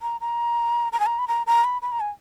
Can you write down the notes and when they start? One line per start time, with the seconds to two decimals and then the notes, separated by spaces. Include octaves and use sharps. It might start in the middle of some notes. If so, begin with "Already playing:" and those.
0.02 A#5
0.21 A#5
0.93 A#5
1.00 G#5
1.06 A#5
1.19 B5
1.28 A#5
1.47 A#5
1.64 B5
1.82 B5
1.92 A#5
2.00 G#5